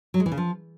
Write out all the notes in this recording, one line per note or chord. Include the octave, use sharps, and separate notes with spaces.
F#3
G#3
E3
C#3
F3